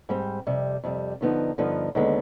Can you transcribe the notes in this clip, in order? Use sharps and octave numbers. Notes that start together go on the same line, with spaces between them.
G#2 G3 C4
F2 C3 G3
F2 C3 G3
G2 D3 F3 B3 D#4
G2 D3 F3 B3 D#4
D#2 D3 G#3 B3